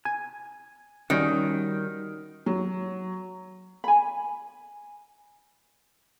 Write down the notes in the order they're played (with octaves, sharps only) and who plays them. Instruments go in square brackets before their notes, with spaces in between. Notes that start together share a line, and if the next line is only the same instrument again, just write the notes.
[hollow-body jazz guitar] G#5
[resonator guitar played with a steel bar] D#3 [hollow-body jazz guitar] G3 C#4 F#4
[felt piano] F#3
[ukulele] G#5 B5